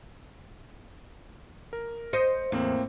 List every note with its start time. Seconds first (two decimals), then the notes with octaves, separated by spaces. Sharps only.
1.73 A#4
2.13 C5 D#5 C#7
2.52 E2 A2 A#3 C4